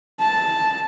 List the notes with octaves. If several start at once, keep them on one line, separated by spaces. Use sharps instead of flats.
A5